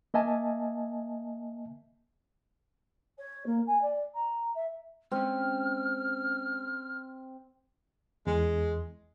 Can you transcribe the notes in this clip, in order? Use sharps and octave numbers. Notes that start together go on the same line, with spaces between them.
A#3 D#5 E5 G#5 A5
C#5
A#3
G#5
D5
A#5
E5
G#3 C4 C#4 F6
E2 G#3